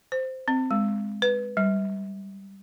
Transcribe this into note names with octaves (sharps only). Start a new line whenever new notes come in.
C5
C4
G#3
B4
G3